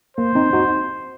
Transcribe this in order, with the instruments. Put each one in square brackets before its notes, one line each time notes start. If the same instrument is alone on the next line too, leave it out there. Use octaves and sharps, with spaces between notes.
[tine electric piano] A#3 [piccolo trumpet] C5
[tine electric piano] C4 D#4
D#4 F#4